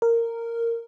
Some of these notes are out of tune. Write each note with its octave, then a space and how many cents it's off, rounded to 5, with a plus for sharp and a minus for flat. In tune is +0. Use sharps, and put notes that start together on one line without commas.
A#4 -10